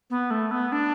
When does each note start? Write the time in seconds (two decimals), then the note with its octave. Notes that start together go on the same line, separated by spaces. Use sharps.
0.10 B3
0.31 A3
0.51 B3
0.72 D4